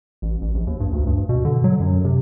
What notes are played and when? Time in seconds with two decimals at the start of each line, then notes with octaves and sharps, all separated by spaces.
0.22 A1
0.41 A1
0.55 A#1
0.67 D#2
0.80 G2
0.93 D2
1.07 G2
1.29 B2
1.45 D3
1.64 F#3
1.80 F#2
2.04 C3